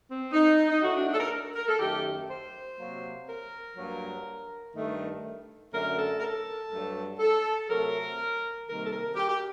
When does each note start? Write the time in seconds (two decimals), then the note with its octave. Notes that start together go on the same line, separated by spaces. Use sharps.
0.08 C4
0.32 D#4
0.69 D#4
0.81 A2 A3 F#4
0.94 D4
1.06 D4
1.13 A4
1.18 A#4
1.55 A#4
1.67 A4
1.79 F#2 D#3 A3 G4
2.28 C5
2.78 C3 F#3 A#3
3.27 A#4
3.76 G2 F#3 A#3
4.74 G2 D#3 A3
5.72 F#2 D3 A3 A#4
5.97 A4
6.18 A#4
6.21 A4
6.71 G2 F#3 A3
7.19 A4
7.69 C3 F#3 A3 A#4
8.67 C3 D#3 G3 A#3 A#4
8.84 A4
8.91 A#4
9.15 G4
9.28 G4